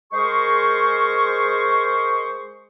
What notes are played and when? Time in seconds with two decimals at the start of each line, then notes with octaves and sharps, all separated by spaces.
0.13 G#3 G#4 A#4 C5 C#6